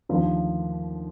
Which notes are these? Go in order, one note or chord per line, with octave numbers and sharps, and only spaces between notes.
D#2 D3 F3 A3